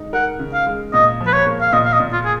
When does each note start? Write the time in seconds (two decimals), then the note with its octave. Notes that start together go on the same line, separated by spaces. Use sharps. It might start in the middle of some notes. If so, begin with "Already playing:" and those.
Already playing: G#3 D#4
0.13 A#4 F#5
0.40 C#3
0.54 F5
0.67 G#3
0.93 A#2 D#5
1.21 F3
1.26 B4
1.33 C#5
1.47 A#3
1.61 F5
1.73 A#2 D#5
1.85 F5
1.93 D#5
2.00 A#2
2.13 F4
2.25 G#4